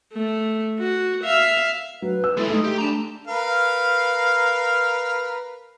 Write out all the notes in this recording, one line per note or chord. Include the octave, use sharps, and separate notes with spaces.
A3
F#4
E5 F5
F#3 B4
E6
G#3 E4 A4
A3 D#4
G4
D4 A5 A#5
A#4 B4 F5